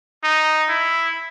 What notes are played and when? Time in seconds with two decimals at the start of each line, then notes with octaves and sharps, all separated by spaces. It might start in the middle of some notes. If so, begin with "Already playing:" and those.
0.23 D#4
0.69 E4